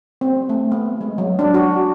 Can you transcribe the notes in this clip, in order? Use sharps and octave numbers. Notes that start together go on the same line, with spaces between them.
C4
A3
B3
G#3
F#3
D4
F#4